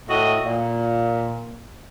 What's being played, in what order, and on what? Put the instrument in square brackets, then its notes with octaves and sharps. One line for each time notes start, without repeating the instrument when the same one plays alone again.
[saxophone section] A2 F#4 D#5
A#2